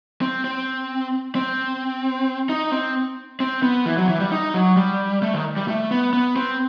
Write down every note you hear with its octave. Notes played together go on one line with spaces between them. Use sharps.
C4
C4
C4
D#4
C4
C4
B3
E3
F#3
E3
G3
D#4
F#3
G3
A3
D#3
G3
A3
B3
B3
C4